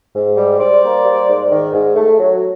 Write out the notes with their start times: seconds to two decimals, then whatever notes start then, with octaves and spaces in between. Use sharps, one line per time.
0.14 G#2
0.37 G3
0.59 G3 C5 D5
0.83 A#3
1.05 G3
1.28 G#2
1.51 D#3
1.73 G#2
1.96 A3
2.19 F#3